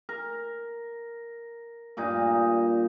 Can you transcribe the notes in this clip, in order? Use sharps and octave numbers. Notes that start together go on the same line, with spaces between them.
A#4
G2 A#2 D#4